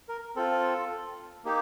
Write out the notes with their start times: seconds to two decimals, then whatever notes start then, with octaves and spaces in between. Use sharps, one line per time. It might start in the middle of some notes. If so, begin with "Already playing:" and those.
0.09 A#4
0.36 C4 F4 A4
1.45 A#3 D#4 G4